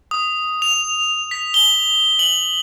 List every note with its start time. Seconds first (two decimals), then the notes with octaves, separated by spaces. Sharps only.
0.11 D#6
0.62 F7
1.31 B6
1.54 G7
2.19 F#7